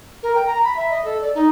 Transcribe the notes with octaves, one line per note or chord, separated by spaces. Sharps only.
A#4
G5
A#5
B5
E5
D#5
A4
D5
D#4